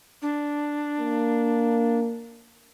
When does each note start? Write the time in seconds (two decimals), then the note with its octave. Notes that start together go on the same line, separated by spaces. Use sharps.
0.22 D4
1.00 A#3